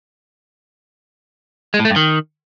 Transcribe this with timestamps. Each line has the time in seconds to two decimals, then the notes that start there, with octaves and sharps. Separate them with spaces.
1.74 G#3
1.79 A2
1.85 A3
1.90 G2
1.96 D#3